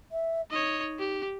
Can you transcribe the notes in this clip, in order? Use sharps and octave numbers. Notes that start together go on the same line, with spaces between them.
E5
D#4 C#5 D#5
G4